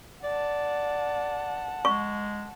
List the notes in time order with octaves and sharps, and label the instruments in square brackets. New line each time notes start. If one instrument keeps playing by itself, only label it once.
[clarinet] D5 [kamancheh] F#5 A5
[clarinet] G#3 [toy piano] C#6